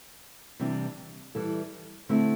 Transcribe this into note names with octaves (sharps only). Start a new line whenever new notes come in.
C3 E3 G3 D4
E3 G3 E4 A4
D3 A3 C4 E4 A4